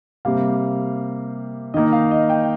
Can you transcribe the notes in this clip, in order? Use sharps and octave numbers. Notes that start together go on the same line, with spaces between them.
C3 G3 A#3 F5
D#3 A#3 D#4 D#5
F5
D#5
G5